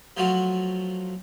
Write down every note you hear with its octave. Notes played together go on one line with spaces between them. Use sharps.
F3 F#3 A3 F4 F#4